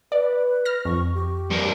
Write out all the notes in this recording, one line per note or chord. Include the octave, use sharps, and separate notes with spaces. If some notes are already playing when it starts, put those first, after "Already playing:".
B4 D5
F6 A#6
F2 C#6
G4
G2 A#4